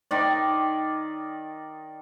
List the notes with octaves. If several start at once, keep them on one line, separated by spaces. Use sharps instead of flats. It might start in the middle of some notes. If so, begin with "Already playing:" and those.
D#3 D5